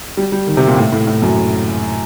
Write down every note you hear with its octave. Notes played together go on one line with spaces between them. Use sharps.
G3
G3
D#3
C3
A#2
A2
A2
A2
F#2